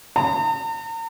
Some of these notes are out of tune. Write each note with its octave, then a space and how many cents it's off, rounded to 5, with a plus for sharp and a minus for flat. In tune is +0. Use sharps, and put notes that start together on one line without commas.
A#5 -45